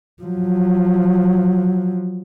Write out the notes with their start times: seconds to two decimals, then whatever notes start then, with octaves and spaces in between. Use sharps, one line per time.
0.23 F3 F#3